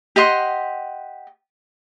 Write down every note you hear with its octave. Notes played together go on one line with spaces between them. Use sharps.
G4 D#5 F#5 C6